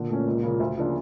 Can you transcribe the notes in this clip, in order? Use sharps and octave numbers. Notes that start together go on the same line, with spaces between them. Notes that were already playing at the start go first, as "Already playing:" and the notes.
Already playing: A#2 D3
A3 C#4
C#2
C#3 F3 A#3
D2
C#3 F3 A#3 D4